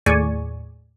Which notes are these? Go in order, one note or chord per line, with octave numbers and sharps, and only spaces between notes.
D#2 A2 G#4 D5 G#5 C#6